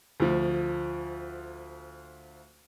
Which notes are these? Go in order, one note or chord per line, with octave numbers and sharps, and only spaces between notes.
D2 F3